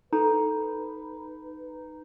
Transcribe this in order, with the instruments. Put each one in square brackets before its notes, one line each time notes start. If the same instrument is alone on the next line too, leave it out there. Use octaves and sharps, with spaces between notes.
[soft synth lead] D#4 [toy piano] A4 A#5 [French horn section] B4